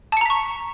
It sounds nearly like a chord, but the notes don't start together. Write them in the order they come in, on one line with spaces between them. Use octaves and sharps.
A5 C#7 A#5 B6 C#6